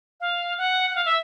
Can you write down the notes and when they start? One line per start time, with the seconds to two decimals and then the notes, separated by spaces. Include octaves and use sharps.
0.21 F5
0.58 F#5
0.90 F#5
0.95 F5
1.05 E5